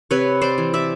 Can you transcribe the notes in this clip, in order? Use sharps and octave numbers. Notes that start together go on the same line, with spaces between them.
C3 B4 C#5
C5 D5
E3
D5 E5